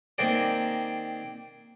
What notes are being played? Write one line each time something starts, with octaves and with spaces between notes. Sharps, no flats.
D#3 A#3 C4 G#4 D5